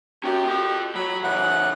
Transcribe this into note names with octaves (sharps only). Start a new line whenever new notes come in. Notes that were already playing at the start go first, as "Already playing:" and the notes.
C#4 F#4 G4
F4 G5
F#3 B5
C#3 E3 F#5